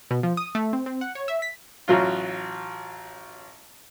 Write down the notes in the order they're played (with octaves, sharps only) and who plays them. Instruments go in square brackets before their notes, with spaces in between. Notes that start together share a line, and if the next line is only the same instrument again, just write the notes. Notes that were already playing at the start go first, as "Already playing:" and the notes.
[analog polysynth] B2
F3
D#6
A3
C4
C4
F#5
C#5
E5
B6
[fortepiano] A1 F#3 F4